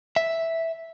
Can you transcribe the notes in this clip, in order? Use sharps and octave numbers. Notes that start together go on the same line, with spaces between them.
E5